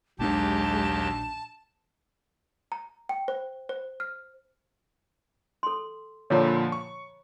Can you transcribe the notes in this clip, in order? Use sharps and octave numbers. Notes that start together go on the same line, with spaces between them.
A#1 D#2 F#3 G#3 C#4 D4 G4 A5
A#5
G5
C5
C5
F6
A4 C6
A#2 D3 F3 C#5 A#5 B5
B5
C#6